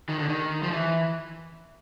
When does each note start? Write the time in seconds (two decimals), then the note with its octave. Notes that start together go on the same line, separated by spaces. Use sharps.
0.09 D#3
0.19 D3
0.29 D#3
0.63 F3
0.72 E3